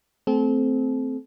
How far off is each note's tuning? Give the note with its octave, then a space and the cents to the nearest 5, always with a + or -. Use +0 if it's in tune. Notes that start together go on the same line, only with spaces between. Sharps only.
A3 +15 C4 -10 A4 -35